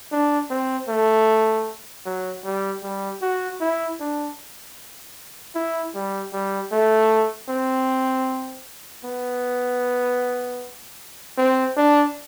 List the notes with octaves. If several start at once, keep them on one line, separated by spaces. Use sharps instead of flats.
D4
C4
A3
F#3
G3
G3
F#4
E4
D4
E4
G3
G3
A3
C4
B3
C4
D4